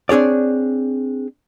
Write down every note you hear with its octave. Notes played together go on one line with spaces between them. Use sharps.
C4 D4 G#4 C#5 D5